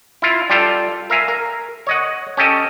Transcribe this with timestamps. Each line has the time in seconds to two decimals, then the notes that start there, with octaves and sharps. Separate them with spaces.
0.22 E4 F4
0.50 G3 F4 G4 A4
1.10 A#4 E5 F5 G#5
1.28 A#4
1.87 C#5 D#5 F#5
2.37 C#4 G4 A4 D#5